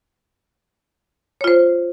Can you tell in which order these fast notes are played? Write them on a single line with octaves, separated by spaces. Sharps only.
C#5 F4 C5